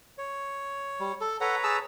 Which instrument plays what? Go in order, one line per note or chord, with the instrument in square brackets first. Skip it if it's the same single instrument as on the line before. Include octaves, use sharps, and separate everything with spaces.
[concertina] C#5
[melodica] G3
A4
[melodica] A4 F#5 [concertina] B4 C#5 A#5
[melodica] G#4 A5 E6